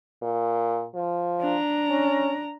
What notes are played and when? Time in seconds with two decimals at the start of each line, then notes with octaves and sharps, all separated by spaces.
0.22 A#2
0.95 F3
1.41 D4 A#5
1.90 C#4